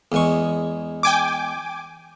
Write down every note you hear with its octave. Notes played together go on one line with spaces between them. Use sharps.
E2 G#3 C#6
G5 G#5 D6